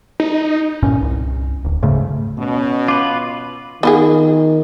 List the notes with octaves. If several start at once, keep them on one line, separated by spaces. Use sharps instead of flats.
D#4
C2 G2 A#2 C#4
C2
D1
G#2 C#3 A3
B2 C#4
F4 B4 D6
D#3 B3 F4 G#4